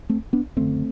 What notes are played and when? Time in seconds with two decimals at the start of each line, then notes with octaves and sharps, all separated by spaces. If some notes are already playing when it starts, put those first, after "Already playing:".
0.10 A3 C4
0.33 B3 D4
0.57 F#1 F#2 D3 A3 C4